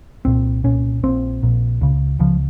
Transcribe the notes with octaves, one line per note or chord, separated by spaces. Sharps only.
C2 A#2 C4
C2 A#2 C#4
A#1 A#2 C4
A#1 A#2
C#2 C#3
C#2 C#3 F3